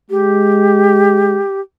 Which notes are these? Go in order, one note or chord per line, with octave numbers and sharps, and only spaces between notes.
G#3 G4